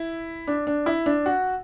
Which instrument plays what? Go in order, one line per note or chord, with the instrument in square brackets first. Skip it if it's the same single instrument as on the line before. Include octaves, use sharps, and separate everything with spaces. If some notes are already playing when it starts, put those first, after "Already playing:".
Already playing: [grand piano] E4
D4
D4
E4
D4
F#4